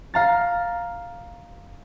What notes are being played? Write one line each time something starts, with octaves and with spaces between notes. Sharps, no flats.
F5 A#5 A6